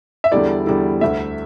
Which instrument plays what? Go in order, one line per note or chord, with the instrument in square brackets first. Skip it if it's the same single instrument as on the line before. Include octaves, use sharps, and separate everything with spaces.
[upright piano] E5
[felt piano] E2 D3 G3 E4 A4 [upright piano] D5
[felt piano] E2 D3 G3 E4 A4
[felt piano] D2 D3 A3 [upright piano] E5